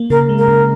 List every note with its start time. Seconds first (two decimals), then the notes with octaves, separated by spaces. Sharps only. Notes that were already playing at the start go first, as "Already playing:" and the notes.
Already playing: A#3
0.10 C#3 A#4
0.29 G#3
0.38 A#4
0.48 C#3